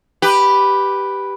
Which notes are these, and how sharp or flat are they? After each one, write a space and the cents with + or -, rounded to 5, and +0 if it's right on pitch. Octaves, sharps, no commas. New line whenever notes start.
G4 +0 B4 +0